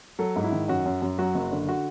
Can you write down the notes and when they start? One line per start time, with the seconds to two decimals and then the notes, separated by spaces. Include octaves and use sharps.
0.19 F#3 A4
0.36 G#2
0.44 E4
0.52 D#3
0.68 F#2 F#4
0.86 F#2
1.02 F#2
1.18 F#3 F#4
1.35 F#1
1.52 D3
1.69 F#4